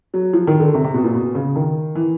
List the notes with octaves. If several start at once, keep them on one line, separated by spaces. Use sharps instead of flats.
F#3
F3
D#3
D3
C3
C3
B2
A#2
B2
C#3
D#3
E3